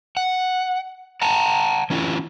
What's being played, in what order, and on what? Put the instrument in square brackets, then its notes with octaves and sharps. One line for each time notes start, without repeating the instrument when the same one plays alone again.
[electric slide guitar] F#5
F#5 A5 A#5
E3 C#4 E4 F4